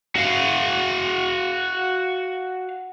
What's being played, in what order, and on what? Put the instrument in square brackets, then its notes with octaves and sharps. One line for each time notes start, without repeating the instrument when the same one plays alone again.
[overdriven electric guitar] F#4 F5